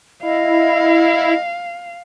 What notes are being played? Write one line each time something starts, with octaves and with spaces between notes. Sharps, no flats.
E4 D#5 F5